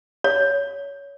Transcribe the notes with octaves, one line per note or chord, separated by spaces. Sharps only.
C#5